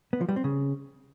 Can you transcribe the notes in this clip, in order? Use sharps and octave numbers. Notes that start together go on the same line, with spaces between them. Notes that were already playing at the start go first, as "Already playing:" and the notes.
B3
F3
G3
C4
C#3